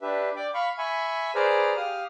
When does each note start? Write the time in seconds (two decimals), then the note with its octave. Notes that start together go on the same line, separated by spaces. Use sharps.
0.02 D4 G4 B4 E5
0.36 D5 G5 D6
0.54 F5 B5 C#6
0.78 E5 G#5 B5 C#6
1.35 G#4 B4 C5 D5 A#5 F6
1.77 G4 F5 D#6 F6